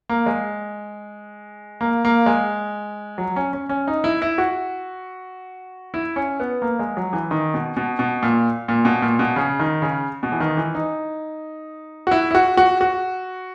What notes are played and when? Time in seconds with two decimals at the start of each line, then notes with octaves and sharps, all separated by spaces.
0.09 A#3
0.26 G#3
1.81 A#3
2.05 A#3
2.26 G#3
3.18 F#3
3.36 C#4
3.53 C#4
3.69 C#4
3.87 D#4
4.04 E4
4.22 E4
4.38 F#4
5.94 E4
6.16 C#4
6.40 B3
6.62 A#3
6.79 G#3
6.97 F#3
7.13 E3
7.31 D#3
7.54 B2
7.77 B2
7.99 B2
8.23 A#2
8.68 A#2
8.85 B2
9.02 A#2
9.19 B2
9.36 C#3
9.60 D#3
9.82 C#3
10.23 B2
10.32 E3
10.40 D#3
10.57 E3
10.75 D#4
12.07 F#4
12.11 E4
12.31 E4
12.35 F#4
12.57 F#4
12.81 F#4